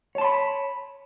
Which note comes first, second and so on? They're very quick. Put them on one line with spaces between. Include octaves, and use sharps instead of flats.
C#5 A5 C6 B5